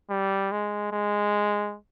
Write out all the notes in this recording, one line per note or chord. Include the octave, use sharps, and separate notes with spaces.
G3
G#3
G#3